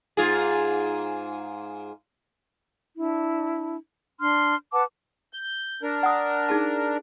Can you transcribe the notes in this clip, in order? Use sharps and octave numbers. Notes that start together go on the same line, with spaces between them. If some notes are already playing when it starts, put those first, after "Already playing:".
G#2 F4 G#4
D4 E4
D4 C6 F6
B4 F#5 A5 D6
G6
D4 A#4
F#5 D#6
D#4 G#4 A5